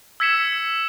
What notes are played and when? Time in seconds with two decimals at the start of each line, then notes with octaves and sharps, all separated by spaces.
0.20 E6 G#6 B6 C#7 E7